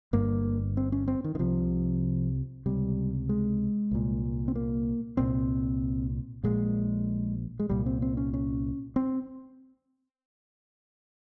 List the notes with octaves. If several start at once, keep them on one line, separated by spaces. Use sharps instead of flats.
G1 G2 A#3
C4
C#4
C4
D#3
D#3
C2 C3 F3
C#2 C3 G3
G#3
C2 A#2
C4
A#3
C2 A#2 C4
A#1 A#2 G#3
G#3
C2 A#2 G3
C4
C4
C#4
C#4
C4